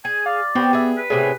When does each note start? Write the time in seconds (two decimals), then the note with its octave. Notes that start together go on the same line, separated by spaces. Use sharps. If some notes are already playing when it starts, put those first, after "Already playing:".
0.05 G#4 G#5
0.26 D5 F5
0.55 B3 C4 F#4 G4
0.73 G#4 E5
0.97 B4
1.10 A2 C3 B3 G#4